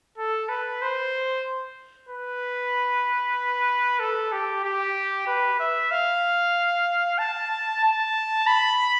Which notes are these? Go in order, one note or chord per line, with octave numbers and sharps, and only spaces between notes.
A4
B4
C5
B4
A4
G4
G4
B4
E5
F5
A5
A5
B5